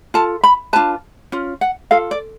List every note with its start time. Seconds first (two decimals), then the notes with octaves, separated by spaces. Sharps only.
0.14 F4 A4 A5
0.44 B5
0.73 D4 F4 B4 A5
1.32 C#4 F4
1.61 F#5
1.91 F4 A4 F5
2.11 D5